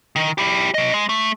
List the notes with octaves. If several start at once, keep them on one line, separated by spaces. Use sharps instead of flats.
D#3
E4 G4
F#3 D#5
G#3
A3